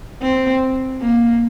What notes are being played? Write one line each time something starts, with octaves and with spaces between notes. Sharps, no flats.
C4
A#3